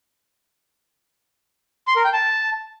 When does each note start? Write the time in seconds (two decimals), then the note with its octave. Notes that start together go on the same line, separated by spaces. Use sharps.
1.88 C6
1.96 A#4
2.05 G5
2.13 A5